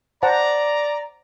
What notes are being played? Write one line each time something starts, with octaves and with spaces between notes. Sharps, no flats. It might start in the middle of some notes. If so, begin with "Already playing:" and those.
C5 D5 F#5 A5 A#5